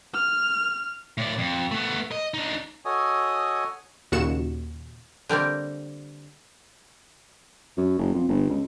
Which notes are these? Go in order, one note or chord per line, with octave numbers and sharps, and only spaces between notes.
F6
A2 D5
F2
A3 B3
D#5
D4 D#4
F#4 A4 C#5 D#5 G#5 D#6
D#2 A#2 C#3 F#4 C#7 E7
D3 G3 A#3 C4
F#2
F#1
F2
G1
C#2